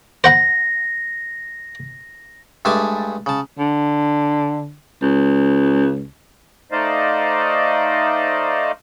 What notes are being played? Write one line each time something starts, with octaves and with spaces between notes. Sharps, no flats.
C5 F#5 B5 A#6
G2 G#3 A3 G#5 A5 D6
C#3 A5
D3
C#2
A3 D#4 C5 D5 D#5 F5